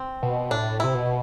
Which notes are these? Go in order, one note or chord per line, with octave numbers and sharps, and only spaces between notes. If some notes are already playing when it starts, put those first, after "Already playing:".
Already playing: C4
B2
A2 D4
C3 E4
B2